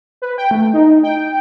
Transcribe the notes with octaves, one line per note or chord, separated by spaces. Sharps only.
B4
G5
A3
D#4
G5